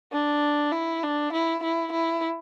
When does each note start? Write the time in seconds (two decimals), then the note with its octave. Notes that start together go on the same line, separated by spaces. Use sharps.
0.12 D4
0.72 E4
1.03 D4
1.32 E4
1.63 E4
1.92 E4